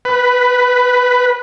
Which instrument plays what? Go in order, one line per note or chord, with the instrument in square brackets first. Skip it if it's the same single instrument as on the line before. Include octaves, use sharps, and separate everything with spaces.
[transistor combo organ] B4